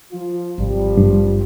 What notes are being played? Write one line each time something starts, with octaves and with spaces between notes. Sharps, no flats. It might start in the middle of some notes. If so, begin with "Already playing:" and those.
F3 F4
G#1 F3 G3
G2